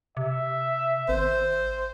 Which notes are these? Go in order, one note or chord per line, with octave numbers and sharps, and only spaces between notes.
C3 E5
G#1 C5